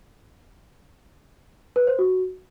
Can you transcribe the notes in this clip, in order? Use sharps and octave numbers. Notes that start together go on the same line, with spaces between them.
B4
C5
F#4